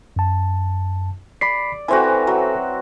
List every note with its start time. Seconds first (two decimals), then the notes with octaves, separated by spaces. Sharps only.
0.16 F#2 A5
1.41 D5 B5 B6 C7
1.88 E3 C4 F#4 A4 C5 G#5
2.27 F#3